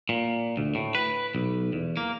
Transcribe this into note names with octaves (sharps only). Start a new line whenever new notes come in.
A#2
D2
A2
B4
B1
E2
A#3